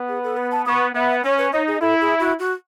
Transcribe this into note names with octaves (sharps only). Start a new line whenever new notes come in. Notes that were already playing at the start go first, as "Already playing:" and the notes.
Already playing: B3
G#4
A4
B4
A5
B3 C#6 D#6
B3 E5
C#4 C#5
B4
D#4 C#5
G#4
E4 A4
G#4
F#4
F#4